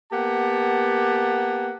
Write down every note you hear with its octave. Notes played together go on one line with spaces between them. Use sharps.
A#3 B3 G4 F#5 A5